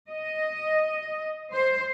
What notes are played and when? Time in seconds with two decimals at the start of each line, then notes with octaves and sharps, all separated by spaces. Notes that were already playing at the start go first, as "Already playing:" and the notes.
0.10 D#5
1.52 C5